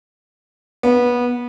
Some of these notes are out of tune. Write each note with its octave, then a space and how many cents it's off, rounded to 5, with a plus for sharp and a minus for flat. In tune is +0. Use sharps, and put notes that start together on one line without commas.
B3 -20